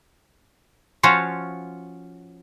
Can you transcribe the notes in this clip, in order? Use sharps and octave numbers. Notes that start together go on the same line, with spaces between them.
F3 C#4 F4 F#4 C5